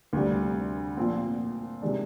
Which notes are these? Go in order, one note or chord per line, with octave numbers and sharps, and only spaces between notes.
D2 C3 G3
A#2 F3 C4
C3 D#3 G#3 D4